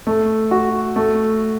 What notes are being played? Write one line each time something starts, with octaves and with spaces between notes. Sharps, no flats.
A3
F#4
A3